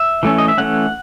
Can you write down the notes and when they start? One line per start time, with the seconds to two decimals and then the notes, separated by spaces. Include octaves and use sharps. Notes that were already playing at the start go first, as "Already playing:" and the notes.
Already playing: E5
0.23 E3 A3 C#4
0.38 D#5
0.48 E5
0.58 E3 A3 C#4 F#5